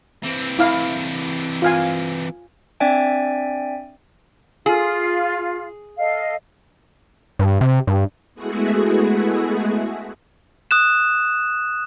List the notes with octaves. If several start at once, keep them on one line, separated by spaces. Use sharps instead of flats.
E3 C4
E4 F5
F4 F5 G#5
C4 D4 D5 E5 G5 G#5
F4 G#4 F5
A4 D#5 F5
G2
C3
G2
G#3 A3 B3 E4 F#4 G#4
D#6 F#6 E7